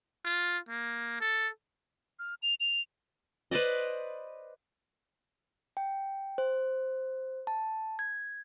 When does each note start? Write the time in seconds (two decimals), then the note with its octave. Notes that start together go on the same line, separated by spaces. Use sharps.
0.25 F4
0.69 A#3
1.20 A4
2.19 F6
2.42 F7
2.60 F7
3.51 B4 C5 D5 D#5
5.77 G5
6.38 C5
7.47 A5
7.99 G#6